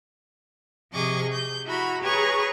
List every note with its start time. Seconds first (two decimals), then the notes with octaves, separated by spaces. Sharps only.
0.93 C3 F3 G#4 D#5 C#6 D6
1.32 G6
1.65 E4 F#4 A#5 B5
2.01 G#4 B4 C#5 A#5 C#6